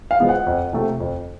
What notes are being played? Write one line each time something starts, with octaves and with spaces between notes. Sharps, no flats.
F5
F3 G#3 B3
F#5
F2
C3 F3 A3
F2